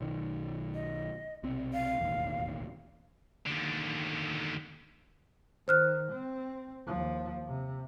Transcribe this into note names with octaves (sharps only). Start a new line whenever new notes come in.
B1 D#3
D#5
B1 C3 C4
F5
E1 A1 D#2
D#2 D3
D#3 C5 F6 F#6
C4
D#2 F3
C3